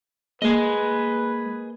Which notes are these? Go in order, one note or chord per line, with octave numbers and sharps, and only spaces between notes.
G#3 A#3 G#4 B4 D#5